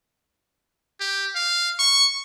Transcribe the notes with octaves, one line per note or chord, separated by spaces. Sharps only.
G4
F5
C#6